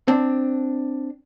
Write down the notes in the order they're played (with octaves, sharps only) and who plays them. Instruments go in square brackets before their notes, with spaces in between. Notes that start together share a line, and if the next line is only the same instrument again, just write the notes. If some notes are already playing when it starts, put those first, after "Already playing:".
[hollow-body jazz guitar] C4 D4